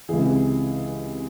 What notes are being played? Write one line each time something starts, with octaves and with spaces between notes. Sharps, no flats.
C#2 C3 E3 G#4